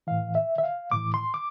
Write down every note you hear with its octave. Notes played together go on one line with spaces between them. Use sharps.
A2 E3 F5
E5
E5
F5
A2 E3 D6
C6
D6